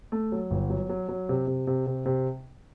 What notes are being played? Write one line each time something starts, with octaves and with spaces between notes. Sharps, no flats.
A3
F#3
G1
F#3
F#3
F#3
C3
C3
C3
C3
C3